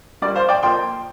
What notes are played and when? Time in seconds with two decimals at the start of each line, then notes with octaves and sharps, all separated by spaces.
0.22 A#2 G3 A#3 D5
0.36 C5 F5
0.49 D5 G5
0.63 F2 F3 A#3 G5 C6